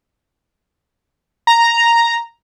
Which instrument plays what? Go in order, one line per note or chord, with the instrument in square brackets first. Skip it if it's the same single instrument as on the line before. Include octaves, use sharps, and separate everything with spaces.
[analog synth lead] A#5